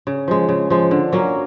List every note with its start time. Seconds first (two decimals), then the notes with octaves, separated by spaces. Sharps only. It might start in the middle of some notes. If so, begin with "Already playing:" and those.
0.07 C#3
0.28 F3 G#3
0.49 C#3
0.70 F3 G#3
0.91 D3
1.12 F#3 A#3 C#4